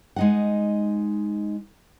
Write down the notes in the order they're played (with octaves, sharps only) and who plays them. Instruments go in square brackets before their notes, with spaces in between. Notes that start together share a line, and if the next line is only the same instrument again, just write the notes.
[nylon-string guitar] G#3 D#4 F#5